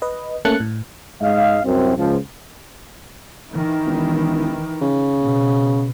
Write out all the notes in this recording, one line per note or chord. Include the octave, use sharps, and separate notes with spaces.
B4 D#5
A3 A#3 C#4 A5 F#6 C#7
A2
G#2 G#3 D#5 F5
C2 F#2 C4
C#2 F3
D#3 E3
E1
C#3
B2